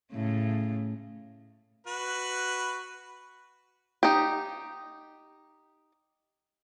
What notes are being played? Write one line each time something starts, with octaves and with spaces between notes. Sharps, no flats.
A2 C#3 A3
F#4 B4
D#4 G4